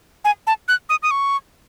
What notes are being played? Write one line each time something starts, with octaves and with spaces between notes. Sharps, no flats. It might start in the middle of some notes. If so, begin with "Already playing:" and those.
G#5
A5
F#6
D#6
D#6
C#6